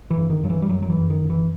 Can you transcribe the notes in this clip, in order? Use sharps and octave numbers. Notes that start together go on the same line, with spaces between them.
E3
G2
D#3
G2 F#3
E3
G3
F#2 F#3
F#3
E3
F#2
D#3
F#2
E3